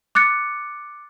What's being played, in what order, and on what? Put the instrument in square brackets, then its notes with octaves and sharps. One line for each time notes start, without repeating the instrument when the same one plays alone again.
[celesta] D6 F#6 A6 C#7